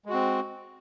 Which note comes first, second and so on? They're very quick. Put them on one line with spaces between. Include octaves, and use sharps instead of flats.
G#3 F#4 C4